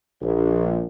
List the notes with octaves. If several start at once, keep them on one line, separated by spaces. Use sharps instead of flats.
A#1